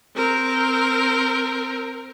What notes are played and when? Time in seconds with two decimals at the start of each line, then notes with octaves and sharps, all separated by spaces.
0.16 C4 A#4